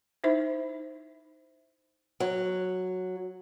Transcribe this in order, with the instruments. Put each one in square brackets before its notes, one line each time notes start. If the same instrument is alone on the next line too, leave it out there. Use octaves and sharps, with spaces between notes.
[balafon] D#4 E4 C5 E5
[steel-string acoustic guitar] F#3